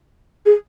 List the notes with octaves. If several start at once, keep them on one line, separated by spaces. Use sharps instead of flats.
G#4